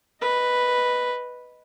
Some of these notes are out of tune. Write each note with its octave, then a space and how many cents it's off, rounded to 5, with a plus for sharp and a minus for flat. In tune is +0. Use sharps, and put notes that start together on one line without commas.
B4 +0 D#5 +0